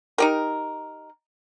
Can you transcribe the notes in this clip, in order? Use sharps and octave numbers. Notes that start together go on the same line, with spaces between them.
D#4 G4 A#4